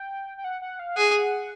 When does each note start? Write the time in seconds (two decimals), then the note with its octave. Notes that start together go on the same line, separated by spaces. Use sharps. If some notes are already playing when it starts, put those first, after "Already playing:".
Already playing: G5
0.38 G5
0.44 F#5
0.62 F#5
0.79 F5
0.96 G#4 F#5